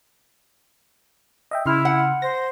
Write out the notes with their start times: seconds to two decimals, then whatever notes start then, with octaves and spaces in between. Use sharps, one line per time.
1.51 D#5 E5 G5
1.66 C#3 E4 C6 F6
1.85 F#5
2.22 C5 A#6